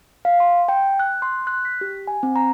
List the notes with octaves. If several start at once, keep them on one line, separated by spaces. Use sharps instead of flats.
F5
C6
G5
F#6
C6
F#6
B6
G4
G#5
C4
A#5